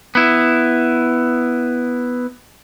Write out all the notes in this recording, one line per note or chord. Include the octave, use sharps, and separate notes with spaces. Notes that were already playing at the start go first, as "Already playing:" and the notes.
B3 E4